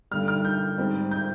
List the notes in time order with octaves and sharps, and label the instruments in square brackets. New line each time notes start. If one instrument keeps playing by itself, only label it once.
[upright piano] G2 D3 G3 F6
F6
G6
G#2 G3 C4
G6